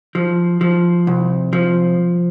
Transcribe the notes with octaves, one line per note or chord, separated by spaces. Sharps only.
F3
F3
C2
F3